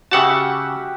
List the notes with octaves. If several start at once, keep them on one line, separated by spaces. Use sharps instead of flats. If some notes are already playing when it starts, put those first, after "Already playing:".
C#3 F#4 G4 E5 F#5 A5